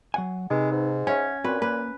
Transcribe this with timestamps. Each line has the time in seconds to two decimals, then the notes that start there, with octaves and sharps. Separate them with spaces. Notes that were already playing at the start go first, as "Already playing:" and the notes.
0.14 F#3 F#5 G#5
0.50 C3 G#3 D#4 B4
0.72 G#2
1.07 C#4 E5 F#5 G#5 G#6
1.44 A#2 C4 F#4 B4
1.62 A#3 B4